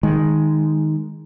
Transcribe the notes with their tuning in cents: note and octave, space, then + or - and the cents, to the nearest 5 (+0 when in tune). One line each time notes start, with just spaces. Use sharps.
D#3 +0 G#3 +0